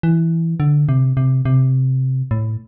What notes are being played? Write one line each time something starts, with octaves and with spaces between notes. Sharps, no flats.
E3
D3
C3
C3
C3
A2